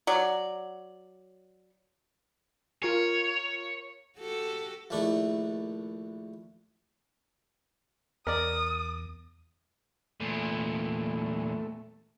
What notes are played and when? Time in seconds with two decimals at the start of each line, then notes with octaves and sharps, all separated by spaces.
0.07 F#3 D5
2.83 F4 A#4 C#5
4.18 F#4 G4 A4
4.90 A#1 D#2 A3 D4 E4 C#6
8.27 E2 A#4 D5 D#6
10.20 E2 A#2 A3